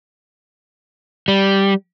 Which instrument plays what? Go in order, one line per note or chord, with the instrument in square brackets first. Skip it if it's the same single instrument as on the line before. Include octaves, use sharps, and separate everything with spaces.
[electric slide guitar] G3